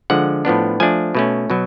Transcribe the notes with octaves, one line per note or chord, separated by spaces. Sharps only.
D3 F3 G#3 F#5
A2 F3 B3 D4
F3 A3 D4 G#5
B2 A3 C#4
B2 F#3